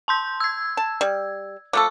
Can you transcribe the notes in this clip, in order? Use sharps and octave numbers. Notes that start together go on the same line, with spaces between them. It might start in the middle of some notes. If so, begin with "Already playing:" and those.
A5 C6 G6
E6 G#6
A5
G3
F3 A3 A4 C#6 D6